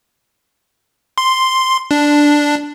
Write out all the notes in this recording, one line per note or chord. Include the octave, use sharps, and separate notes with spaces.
C6
D4